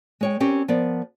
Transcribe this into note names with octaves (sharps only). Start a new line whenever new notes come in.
G#3 C#5 G5
C4 C#4 G4 A#4
F3 B3 A#4 D5